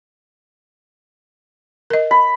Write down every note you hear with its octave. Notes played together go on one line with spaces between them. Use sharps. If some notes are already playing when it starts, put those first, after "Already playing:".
A#4 D#5
B5